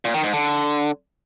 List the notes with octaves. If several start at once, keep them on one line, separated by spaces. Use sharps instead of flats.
A#2
D#3
G#2
D3